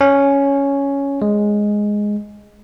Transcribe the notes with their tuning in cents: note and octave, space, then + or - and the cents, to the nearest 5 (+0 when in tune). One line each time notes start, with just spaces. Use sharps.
C#4 +5
G#3 +0